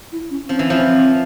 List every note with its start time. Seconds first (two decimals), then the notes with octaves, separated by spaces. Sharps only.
0.12 E4
0.30 C#4
0.49 F3 C4
0.57 E3 C#4
0.66 F3 C4